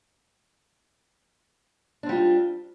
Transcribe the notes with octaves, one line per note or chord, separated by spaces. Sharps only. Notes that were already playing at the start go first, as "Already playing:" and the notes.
G3 C4 D4 F4